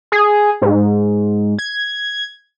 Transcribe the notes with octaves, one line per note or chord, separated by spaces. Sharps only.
G#4
G#2
G#6